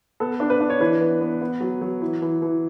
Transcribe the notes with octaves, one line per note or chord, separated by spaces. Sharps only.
B3 A4
D4
B4
D4
C#5
E3 B4
B3
B3
B3
F#3
F#3
E3
E3
E3